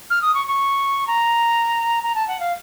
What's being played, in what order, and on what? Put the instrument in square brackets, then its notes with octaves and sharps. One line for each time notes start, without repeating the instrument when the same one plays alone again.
[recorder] F6
D#6
C#6
C#6
A#5
A#5
A5
F#5
F5